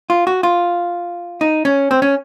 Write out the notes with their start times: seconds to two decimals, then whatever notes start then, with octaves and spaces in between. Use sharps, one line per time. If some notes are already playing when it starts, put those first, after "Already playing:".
0.10 F4
0.27 F#4
0.43 F4
1.41 D#4
1.65 C#4
1.91 C4
2.02 C#4